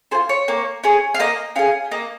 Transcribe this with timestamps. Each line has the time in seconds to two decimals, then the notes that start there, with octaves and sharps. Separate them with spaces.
0.11 G#4 C5
0.15 F4
0.29 C#5
0.48 A#3
0.84 C#4 G#4
1.14 F5
1.20 A#3 D#5
1.56 C#4 G#4 F5
1.92 A#3 D#5